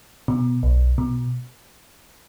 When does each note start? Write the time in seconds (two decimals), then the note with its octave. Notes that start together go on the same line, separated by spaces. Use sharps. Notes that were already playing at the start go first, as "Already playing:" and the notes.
0.28 B2
0.63 B1
0.98 B2